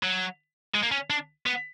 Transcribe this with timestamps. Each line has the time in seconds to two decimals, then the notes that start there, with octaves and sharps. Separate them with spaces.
0.03 F#3
0.75 G#3
0.83 A#3
0.91 C#4
1.10 D4
1.46 B3